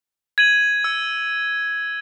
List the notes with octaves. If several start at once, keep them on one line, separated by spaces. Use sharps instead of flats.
G#6 D#7 F#7
E6